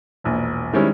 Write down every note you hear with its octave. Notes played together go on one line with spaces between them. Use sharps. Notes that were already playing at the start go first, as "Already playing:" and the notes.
E1 A#1
D#3 G3 G#3 C4 C#4 E4